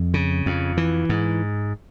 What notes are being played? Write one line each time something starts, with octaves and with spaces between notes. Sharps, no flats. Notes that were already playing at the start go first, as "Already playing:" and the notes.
Already playing: F2
C#3
F2
E3
G#2